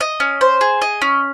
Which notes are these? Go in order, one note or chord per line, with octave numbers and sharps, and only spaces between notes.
D#5
C#4
C5
G#4
D#5
C#4